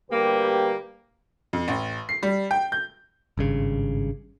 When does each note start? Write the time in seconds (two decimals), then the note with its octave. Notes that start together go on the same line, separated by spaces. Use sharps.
0.11 D2 G3 A#3 G4 B4
1.53 F2
1.68 A1
2.09 C7
2.23 G3
2.51 G5
2.72 G6
3.37 G#1 G2 C#3